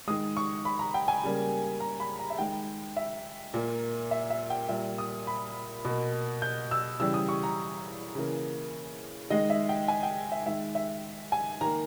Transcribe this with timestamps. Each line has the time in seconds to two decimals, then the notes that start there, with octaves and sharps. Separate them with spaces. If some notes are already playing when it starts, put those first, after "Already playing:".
0.07 D#3 G#3 D#6
0.37 C#6
0.65 B5
0.79 A#5
0.94 G5
1.08 G#5
1.23 C#3 G3 A#3
1.80 A#5
2.00 B5
2.19 A#5
2.30 E5
2.38 D#3 G#3 G5
2.97 E5
3.54 A#2 A#3
4.11 E5
4.30 E5
4.50 G5
4.69 A#2 G3 A#3 E5
4.98 D#6
5.27 B5
5.85 B2 A#3
6.42 G6
6.71 E6
7.00 C#3 E3 G3 E6
7.14 D#6
7.29 C#6
7.43 A#5
8.15 C#3 E3 A#3
9.30 D#3 G#3 D#5
9.50 E5
9.69 G5
9.88 G#5
10.03 G5
10.32 E5
10.46 D#3 G#3 E5
10.75 E5
11.32 G#5
11.61 D#3 A#3 A#5